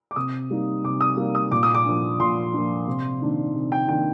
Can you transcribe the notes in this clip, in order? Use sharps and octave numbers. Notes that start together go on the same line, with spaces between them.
D6
C3 D#6
G3 A#3 D#4
C3 D6
D#6
G3 A#3 D#4
D#6
A#2 D6
D#6
D6
F3 A#3 D4
A#2 C6
F3 A#3 D4
C3
D#3 A#3 D4
C3
G5
D#3 A#3 D4 G5